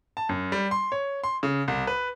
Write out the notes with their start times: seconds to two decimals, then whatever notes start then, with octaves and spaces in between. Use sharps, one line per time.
0.17 A5
0.29 F#2
0.52 G3
0.71 C6
0.92 C#5
1.24 C6
1.43 C#3
1.68 C2
1.87 B4